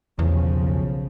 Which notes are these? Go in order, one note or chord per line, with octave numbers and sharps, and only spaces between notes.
B1 E2 C#3 F3